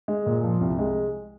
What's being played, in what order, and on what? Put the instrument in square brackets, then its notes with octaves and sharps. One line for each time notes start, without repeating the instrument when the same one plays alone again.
[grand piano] G#3
A#2
F3
C2
G#3